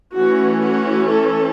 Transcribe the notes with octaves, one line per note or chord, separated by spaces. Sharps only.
E3 A3 C#4 F#4
F#4
A4